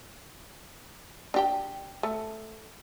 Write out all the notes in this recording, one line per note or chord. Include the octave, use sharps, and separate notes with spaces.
D4 G4 G5
A3